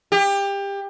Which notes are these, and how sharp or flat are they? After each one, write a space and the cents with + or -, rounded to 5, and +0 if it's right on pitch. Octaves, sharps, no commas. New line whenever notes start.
G4 +25